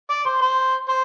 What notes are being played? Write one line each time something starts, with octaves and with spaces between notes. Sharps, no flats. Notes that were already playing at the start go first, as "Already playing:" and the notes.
D5
C5
C5
C5